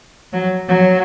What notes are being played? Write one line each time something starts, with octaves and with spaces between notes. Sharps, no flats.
F#3
F#3